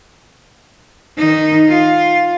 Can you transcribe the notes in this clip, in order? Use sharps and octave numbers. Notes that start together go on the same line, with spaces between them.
D#3 D#4
F4